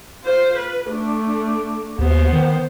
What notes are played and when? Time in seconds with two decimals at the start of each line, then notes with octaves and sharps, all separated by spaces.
0.24 F4 C5
0.57 B4
0.88 A3 D4
1.99 D#2 B3 C5
2.33 D#3